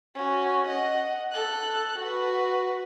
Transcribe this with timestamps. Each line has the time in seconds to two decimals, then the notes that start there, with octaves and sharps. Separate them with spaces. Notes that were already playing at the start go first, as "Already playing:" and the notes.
0.15 C#4 F#4
0.67 D#5 F#5
1.32 A4 F#6
1.99 F#4 B4